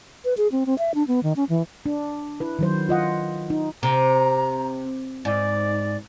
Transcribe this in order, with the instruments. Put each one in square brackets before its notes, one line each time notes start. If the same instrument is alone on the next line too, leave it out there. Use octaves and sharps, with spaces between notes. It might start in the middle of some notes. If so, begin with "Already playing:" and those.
[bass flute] B4
G#4
C4
C4
E5
D4
B3
D#3
C#4
E3
[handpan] D4
E4 B4
D#3 F#3 C5
F4 D#5 F#5
D#4
[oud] C3 [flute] A#5
[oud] G#2 [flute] D5